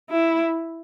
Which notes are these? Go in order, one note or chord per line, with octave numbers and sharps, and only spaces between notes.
E4